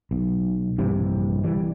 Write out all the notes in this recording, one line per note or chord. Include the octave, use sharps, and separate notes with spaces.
B1
A#1 G2 C3 E3
E3 G3